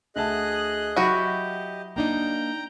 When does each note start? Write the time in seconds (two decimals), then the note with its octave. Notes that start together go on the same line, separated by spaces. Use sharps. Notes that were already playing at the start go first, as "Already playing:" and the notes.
0.16 D2 G#4 D#5 E5 A5 F#6
0.96 F#3 E4 F#4 G4 D#5 A#6 D#7
1.96 A#3 D4 D#4 G5 A#5